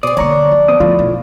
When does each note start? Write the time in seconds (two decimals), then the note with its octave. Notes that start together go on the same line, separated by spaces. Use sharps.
0.03 B2 C4 G#4 D5 D#6
0.17 D3 A#3 D4 C#5 A#5 C#6
0.52 F3
0.68 B2 C4 D#6
0.80 F2 A2 F3 F4
0.99 B1